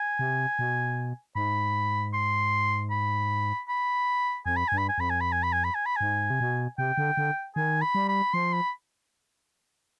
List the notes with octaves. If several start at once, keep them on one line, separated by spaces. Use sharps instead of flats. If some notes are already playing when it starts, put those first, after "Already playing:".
Already playing: G#5
C3
B2
G#2 B5
C6
B5
B5
F2 G#5
B5
G2 G#5
B5
G#5
F2 B5
G#5
B5
G#5
B5
G#5
B5
G#5
B5
G#2 G#5
C3
B2
C3 G5
D3
D3
D#3 G#5
B5
G3
B5
F3 C6
B5